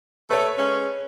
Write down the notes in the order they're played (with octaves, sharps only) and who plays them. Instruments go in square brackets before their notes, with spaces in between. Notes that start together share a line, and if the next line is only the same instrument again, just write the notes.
[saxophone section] A3 [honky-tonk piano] B4 C#5
[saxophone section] G#3 C#4